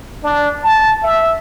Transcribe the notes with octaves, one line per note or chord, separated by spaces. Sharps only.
D4
A5
E5